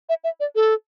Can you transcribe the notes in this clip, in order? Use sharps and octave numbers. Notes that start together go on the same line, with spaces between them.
E5
E5
D5
A4